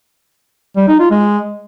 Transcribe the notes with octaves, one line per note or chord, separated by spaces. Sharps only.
G3
D#4
F4
G#3